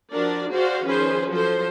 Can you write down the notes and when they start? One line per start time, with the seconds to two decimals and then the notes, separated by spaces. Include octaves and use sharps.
0.11 F3 D4 F#4 A#4 D5
0.50 F#4 G#4 C5 D5 F5
0.85 D#3 F3 C#4 G#4 B4 C5
1.29 F3 F#3 A4 C5